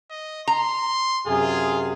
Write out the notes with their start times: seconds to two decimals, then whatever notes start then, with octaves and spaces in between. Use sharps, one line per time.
0.10 D#5
0.48 A#5 C6
1.27 F#2 C3 F4 G#4